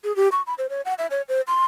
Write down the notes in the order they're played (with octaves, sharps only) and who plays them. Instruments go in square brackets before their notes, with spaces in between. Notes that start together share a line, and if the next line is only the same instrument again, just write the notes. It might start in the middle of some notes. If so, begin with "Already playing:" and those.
[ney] G#4
G4
C#6
B5
C5
C#5
F#5
E5
C#5
C5
C6